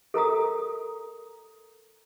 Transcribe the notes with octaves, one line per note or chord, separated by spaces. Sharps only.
A4 A#4 A#5 D#6